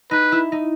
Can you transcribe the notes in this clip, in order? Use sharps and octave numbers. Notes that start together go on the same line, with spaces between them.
D#4 B4
E4
D#4